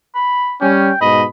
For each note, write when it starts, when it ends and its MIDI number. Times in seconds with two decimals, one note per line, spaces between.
0.15 0.56 83
0.61 0.90 55
0.61 0.90 61
0.61 1.00 79
1.01 1.25 44
1.01 1.25 47
1.01 1.25 75
1.01 1.24 83